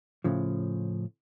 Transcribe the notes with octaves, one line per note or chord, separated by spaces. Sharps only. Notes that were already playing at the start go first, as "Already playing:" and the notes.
A2 C#3 F3